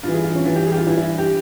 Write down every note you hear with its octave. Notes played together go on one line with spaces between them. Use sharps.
G2 E3 F4
G#4
F4
C#4
G2 E3 F4
G4
G#4
G4
F4
G2 E3 E4
E4
G4